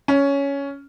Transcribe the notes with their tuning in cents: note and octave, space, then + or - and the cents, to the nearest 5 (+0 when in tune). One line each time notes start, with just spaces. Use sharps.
C#4 +10